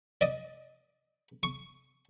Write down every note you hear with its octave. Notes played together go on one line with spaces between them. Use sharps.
D5 D#5
C#6